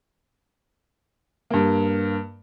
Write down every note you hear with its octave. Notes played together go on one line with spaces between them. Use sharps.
G2 A#3